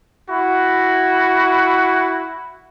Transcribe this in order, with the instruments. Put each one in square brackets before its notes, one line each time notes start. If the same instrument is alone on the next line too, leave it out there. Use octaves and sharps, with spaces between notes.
[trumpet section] E4 F#4